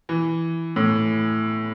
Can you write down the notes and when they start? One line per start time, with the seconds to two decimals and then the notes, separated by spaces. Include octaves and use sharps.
0.09 E3
0.76 A2